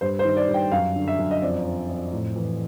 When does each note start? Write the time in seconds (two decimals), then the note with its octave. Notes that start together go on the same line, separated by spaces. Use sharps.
0.01 G2 C5
0.19 C5
0.25 D#3
0.37 D5
0.48 G2
0.54 G5
0.72 F#2 F5
0.96 D3
1.08 E5
1.19 F#2
1.31 D#5
1.42 F2 D5
1.65 F2
1.89 F2
2.12 A2
2.36 E3